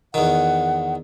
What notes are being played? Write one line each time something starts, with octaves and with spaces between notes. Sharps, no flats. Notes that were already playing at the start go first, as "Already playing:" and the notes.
E2 D#3 F#5